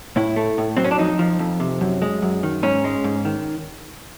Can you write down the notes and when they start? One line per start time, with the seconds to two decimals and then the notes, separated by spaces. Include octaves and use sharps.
0.16 A2 E4
0.36 A3
0.58 A2
0.77 F#3 C4
0.84 C#4
0.91 D4
0.98 F2 D#4
1.19 F3
1.39 F2
1.60 C3
1.81 F#2
2.02 G#3
2.22 F#2
2.43 D#3
2.63 G#2 C#4
2.84 G#3
3.04 G#2
3.25 D#3